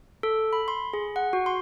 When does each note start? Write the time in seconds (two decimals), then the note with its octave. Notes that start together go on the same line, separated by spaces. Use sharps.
0.23 A4
0.53 B5
0.68 C6
0.93 G#4
1.16 F#5
1.33 F#4
1.46 C6